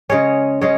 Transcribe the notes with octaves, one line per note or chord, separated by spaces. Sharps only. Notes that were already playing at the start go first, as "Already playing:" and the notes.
C#3 G#3 C#4 C#5
C#3 G#3 C#4 C#5